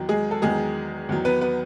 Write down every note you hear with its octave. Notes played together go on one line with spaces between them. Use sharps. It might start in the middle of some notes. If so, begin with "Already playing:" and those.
Already playing: E2 D#3 F#3
G#3 G#4
A4
E2 D#3 F#3 G#3 G#4
E2 D#3 F#3
B3 B4
B3 B4